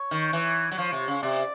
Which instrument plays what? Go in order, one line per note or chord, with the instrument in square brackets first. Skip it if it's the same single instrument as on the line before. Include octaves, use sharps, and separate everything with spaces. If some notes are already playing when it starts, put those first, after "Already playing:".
Already playing: [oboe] C#5
[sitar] D#3
E3
F#3
[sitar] F3 [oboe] C#5
[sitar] C3
C#3
[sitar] C3 [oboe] D5